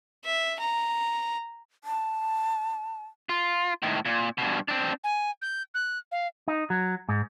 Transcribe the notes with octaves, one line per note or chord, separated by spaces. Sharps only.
E5
A#5
A5
F4
A2 D#3
A#2
G2 B2
C4 D4
G#5
G6
F#6
F5
D#4
F#3
G#2